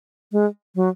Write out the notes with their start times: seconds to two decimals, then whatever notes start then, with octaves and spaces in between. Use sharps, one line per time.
0.32 G#3
0.75 F#3